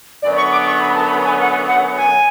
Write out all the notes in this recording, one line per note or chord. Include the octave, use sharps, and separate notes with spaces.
F#2 D3 F#3 B3 D5
C#6
D6
C#6
B5
A5
B5
G#5
F#5
F#5
G#5